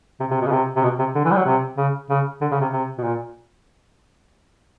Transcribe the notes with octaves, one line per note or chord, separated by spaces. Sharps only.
C3
C3
B2
C#3
C3
C3
B2
C3
D3
E3
G3
F#3
C3
C#3
C#3
D3
C#3
C3
C3
B2
A#2